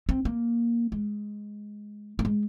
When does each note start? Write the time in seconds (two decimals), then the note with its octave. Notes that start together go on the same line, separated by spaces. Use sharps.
0.09 C4
0.25 A#3
0.92 G#3
2.19 A#3
2.25 G#3